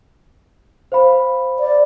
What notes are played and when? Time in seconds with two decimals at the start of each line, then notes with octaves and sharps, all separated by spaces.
0.92 C5 F5 B5
1.59 D5